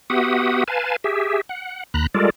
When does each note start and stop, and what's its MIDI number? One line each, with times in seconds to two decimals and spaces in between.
0.10 0.64 59
0.10 0.64 66
0.10 0.64 67
0.10 0.64 76
0.10 0.64 78
0.10 0.64 87
0.68 0.96 71
0.68 0.96 77
0.68 0.96 80
0.68 0.96 81
1.04 1.41 67
1.04 1.41 68
1.04 1.41 76
1.49 1.83 78
1.94 2.07 39
1.94 2.07 82
1.94 2.07 83
1.94 2.07 90
2.14 2.30 55
2.14 2.30 56
2.14 2.30 65
2.14 2.30 69
2.14 2.30 70
2.14 2.30 74